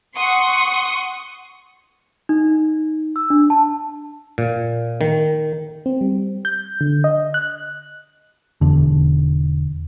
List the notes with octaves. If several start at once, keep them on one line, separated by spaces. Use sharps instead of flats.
F#5 C6 C#6 D#6
D#4
E6
D4
A5
A#2
D#3
C4
G3
G6
D3
D#5
F#6
E1 E2 D3